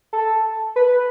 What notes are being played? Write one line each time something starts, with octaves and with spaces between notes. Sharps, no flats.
A4
B4